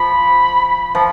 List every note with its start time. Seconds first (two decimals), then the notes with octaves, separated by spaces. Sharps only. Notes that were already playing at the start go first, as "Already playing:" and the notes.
Already playing: F3 B5
0.95 F3